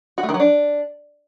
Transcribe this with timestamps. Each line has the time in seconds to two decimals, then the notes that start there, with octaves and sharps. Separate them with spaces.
0.18 F#4
0.23 A3
0.29 D#3
0.34 F#3
0.40 D4